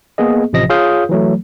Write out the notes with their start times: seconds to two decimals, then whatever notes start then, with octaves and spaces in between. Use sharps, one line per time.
0.18 A#3 B3 G#4 D#5
0.53 A1 C3 F3 D#5 A#6
0.69 F4 G#4 C#5 F5 D#6 G6
1.09 E3 F#3 A3